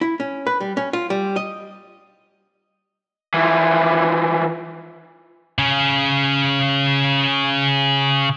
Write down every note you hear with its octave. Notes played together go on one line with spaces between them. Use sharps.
E4
C#4
B4
G3
C#4
F4
G3
D#5
E3 F3
C#3 C#4